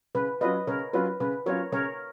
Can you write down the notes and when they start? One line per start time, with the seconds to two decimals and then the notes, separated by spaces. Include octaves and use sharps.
0.15 C#3 B4
0.41 F#3 C#4 F4 B4 D#5
0.67 C#3 A#4 C#5
0.93 F#3 C#4 F4 B4
1.20 C#3 B4
1.46 F#3 C#4 F4 A#4 C#5
1.72 C#3 A#4 C#5